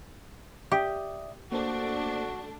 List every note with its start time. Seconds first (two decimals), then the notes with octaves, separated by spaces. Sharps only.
0.72 G4 D5 E5 D#6
1.52 A3 A#3 D4 F#4 C5